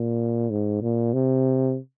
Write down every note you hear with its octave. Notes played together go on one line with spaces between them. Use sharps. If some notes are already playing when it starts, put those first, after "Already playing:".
Already playing: A#2
G#2
A#2
C3